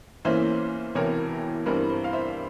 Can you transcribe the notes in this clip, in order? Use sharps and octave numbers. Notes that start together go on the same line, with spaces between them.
E2 E3 A#3 C#4 C5 E5
E1 E2 C3 E3 A#4 C#5
G2 E3 G3 C4 A#4
C5
F5
C5 E5